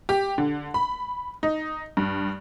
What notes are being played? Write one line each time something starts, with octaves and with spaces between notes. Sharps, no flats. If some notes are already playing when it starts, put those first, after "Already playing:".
G4
D3
B5
D#4
G2